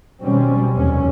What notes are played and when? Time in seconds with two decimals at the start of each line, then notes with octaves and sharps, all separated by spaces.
0.22 B2 D#3 F#3 G3 C4 C#4
0.77 F1 D#2 E3 A#3 C#4